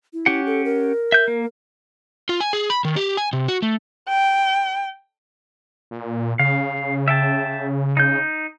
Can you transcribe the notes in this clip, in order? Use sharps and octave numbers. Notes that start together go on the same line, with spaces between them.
E4
C#4 G4 F#5
A4
A#4
E5 G6
A#3
F4
G#5
G#4
B5
D#3
G4
G#5
C3
F#4
A3
G5
A#2
C#3 F5
E5 G5 A5
D#4 G6